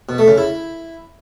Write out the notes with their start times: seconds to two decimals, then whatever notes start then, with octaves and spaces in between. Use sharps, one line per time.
0.09 B2
0.18 A3
0.28 C#3
0.38 E4